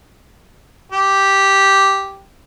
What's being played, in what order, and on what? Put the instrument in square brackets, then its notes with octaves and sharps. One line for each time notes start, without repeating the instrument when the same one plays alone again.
[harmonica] G4